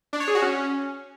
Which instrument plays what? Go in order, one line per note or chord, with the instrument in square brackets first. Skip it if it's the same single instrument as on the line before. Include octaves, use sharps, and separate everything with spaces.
[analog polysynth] D4
C#5
G#4
F#4
C#4